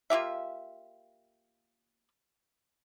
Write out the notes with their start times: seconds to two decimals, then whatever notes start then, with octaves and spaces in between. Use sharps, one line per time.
0.10 A#3 F4 G4 E5